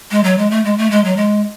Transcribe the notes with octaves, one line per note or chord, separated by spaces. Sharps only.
G#3
F#3
G#3
A3
G#3
A3
G#3
F#3
G#3